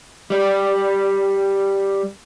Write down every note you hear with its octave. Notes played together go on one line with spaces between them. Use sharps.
G3 D5